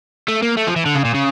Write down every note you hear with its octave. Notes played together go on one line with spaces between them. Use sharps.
A3
A#3
A3
F3
E3
D3
C#3
A#2
C#3